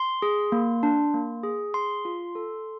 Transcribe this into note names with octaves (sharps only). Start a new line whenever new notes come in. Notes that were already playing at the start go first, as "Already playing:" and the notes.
Already playing: C6
G#4
A#3
D4
A#3
G#4
G#4 C6
F4
A4